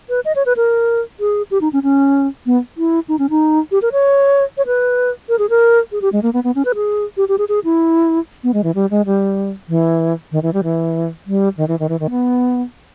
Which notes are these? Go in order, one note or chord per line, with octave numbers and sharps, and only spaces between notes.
B4
D#5
C#5
B4
A#4
G#4
G4
D#4
C#4
C#4
B3
E4
D#4
C#4
D#4
G4
A#4
C#5
C#5
B4
A#4
G#4
A#4
G#4
G4
G#3
A#3
B3
B3
C#4
B4
G#4
G4
G4
G#4
G#4
E4
B3
G#3
E3
G3
G#3
G3
E3
D#3
E3
G3
E3
G3
D#3
E3
D#3
E3
D#3
B3